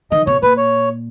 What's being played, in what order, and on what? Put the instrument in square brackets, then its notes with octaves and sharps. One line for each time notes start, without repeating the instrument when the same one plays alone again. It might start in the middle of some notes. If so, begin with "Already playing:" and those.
[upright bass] D#3 [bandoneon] D#5
[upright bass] B2 [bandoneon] C#5
[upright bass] A#2 [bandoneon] B4
[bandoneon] C#5